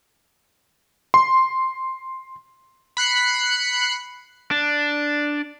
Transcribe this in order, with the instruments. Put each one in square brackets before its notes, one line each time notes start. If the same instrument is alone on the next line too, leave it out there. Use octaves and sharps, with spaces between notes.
[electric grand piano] C6
[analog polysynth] B5 F#6 C7 C#7
[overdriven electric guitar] D4